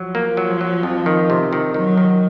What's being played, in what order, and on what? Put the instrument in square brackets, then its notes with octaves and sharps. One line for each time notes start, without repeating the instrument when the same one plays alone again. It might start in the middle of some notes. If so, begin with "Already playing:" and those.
Already playing: [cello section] F3 [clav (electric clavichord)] F#3
[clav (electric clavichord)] A#3
F#3
F#3
F2
D#3
C3
D#3
[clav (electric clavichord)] D#3 [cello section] F#3
[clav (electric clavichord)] D#3